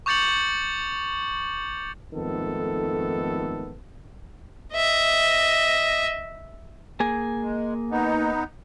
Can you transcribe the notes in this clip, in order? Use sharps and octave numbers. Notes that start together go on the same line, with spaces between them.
C#6 D6 G6 A6 C#7 F#7
F2 G#2 D#3 A3 B3 A4
D#5 E5
A#3 G#4 G#5
G#3
B3 D#4